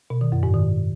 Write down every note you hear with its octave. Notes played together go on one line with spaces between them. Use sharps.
B2
D#3
F#2
G#2
D#3